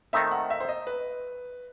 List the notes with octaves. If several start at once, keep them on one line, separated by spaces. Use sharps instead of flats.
D#3 A3 C4 D#4 E5
F#5
E5
C5
D#5
B4